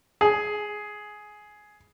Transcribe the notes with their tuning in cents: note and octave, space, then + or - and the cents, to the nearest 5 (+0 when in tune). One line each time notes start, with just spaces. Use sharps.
G#4 +10